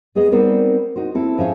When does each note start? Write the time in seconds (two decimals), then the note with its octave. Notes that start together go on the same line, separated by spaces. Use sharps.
0.15 G#3 B3 G#4 C#5 D#5
0.31 G3 B3 C4 D#4 A#4 D5
0.96 D#4 F#4 C5
1.15 C4 E4 A4
1.38 G#2 F3 C#4 C5 E5 F5